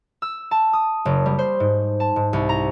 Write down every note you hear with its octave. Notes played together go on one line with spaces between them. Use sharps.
E6
A5
D#6
F#1
G3
C5
G#2
A5
G#2
C2
A#5